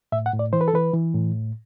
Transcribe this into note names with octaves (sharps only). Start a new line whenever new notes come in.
A2 E5
F#5
A2
D5
E3 C5
B4
A4
E3 B4
E3
A2